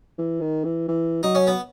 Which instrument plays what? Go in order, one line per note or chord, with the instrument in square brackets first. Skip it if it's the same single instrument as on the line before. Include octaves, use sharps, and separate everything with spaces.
[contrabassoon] E3
D#3
E3
E3
[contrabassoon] F#3 [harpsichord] D#4
[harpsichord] C#4
B3